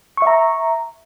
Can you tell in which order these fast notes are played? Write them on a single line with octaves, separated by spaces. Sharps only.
C#6 E5 A#5